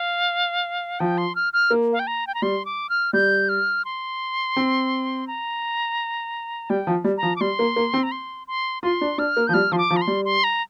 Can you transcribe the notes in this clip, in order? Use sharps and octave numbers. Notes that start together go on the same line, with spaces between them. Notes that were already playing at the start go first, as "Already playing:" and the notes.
Already playing: F5
F3 G5
C6
F6
F6
A#3
F5
G5
A#5
G5
A#5
G3 C6
D6
F6
G3 G6
F6
C6
C4
A#5
G3 G5
F3
G3
A#5
F3
D6
G3 C6
A#3
A#3
C4
A#5
C6
C6
F4 C6
D4
D4 F6
A#3
F3 G6
G3 F6
F3 C6
D6
F3
A#5
C6
G3
C6
A#5